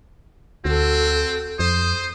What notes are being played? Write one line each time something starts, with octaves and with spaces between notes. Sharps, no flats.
D2 C4 F#4 A4
F2 C5 D#6